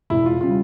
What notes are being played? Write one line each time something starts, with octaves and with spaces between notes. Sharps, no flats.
E1 E4
F4
C#3 G3 F4